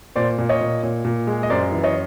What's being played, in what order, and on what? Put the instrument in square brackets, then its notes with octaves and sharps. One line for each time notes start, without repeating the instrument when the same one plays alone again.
[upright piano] A#2 C5 D5
A#2
C#5 D#5
A#2
A#2
A#2
G#3
D#5
F#2 C5 D5
E3
C#5 D#5